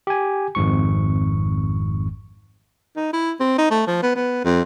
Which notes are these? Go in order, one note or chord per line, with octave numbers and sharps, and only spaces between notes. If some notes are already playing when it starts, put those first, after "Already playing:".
G4 G#5
G#1 F2 G#2 C#6
D#4
E4
C4
D#4
A3
F3
B3
B3
F2